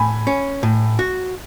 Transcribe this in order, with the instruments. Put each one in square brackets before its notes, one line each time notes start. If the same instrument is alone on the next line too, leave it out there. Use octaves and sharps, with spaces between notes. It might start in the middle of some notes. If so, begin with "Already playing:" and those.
Already playing: [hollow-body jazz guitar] A2 [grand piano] G#5 B5
[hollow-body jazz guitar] C#4
A2
F#4